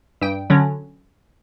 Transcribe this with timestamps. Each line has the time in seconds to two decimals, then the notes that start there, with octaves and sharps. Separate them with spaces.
0.21 G2 G5
0.50 D3 F#3 C#4